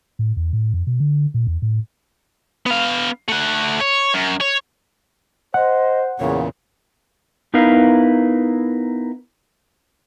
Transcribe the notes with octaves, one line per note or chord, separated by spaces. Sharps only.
A2
E2
A2
F2
B2
D3
A#2
E2
A2
B3 F5
A3 F#5
C#5
F#2
C#5
C5 D#5 F#5
E2 A#2 C#3 C#5
B3 D#4 E4 A#4 B4 F5